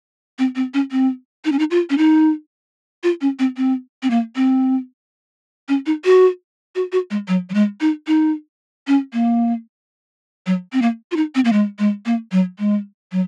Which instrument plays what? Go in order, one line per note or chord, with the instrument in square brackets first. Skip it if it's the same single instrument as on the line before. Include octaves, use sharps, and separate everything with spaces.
[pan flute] C4
C4
C#4
C4
D#4
C#4
D#4
F4
C#4
D#4
F4
C#4
C4
C4
C4
A#3
C4
C#4
D#4
F#4
F#4
F#4
G#3
F#3
F#3
G#3
D#4
D#4
C#4
A#3
F#3
C4
A#3
F4
D#4
C4
A#3
G#3
G#3
A#3
F#3
G#3
F#3